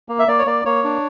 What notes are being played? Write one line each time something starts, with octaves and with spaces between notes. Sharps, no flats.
A#3
E5
A#3 D5
C#5
A#3 D5
A#3 C#5
D4